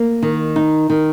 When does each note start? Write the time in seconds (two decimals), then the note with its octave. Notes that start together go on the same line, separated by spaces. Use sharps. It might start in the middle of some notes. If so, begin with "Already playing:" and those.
Already playing: A#3
0.23 D#3
0.56 D#4
0.90 D#3